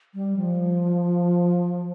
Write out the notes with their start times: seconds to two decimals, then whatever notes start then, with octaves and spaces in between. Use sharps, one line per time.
0.15 G3
0.36 F3